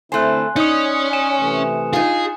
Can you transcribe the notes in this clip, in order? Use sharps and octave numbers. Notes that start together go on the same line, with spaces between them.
D3 A3 C4 E4 C5 G#5 C6 F#6
C#4 D#4 C#5 D5 D#6 C#7
G#5 E7
C3 E3 A3
D#4 F4 G#4